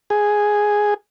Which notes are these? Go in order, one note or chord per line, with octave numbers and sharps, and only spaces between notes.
G#4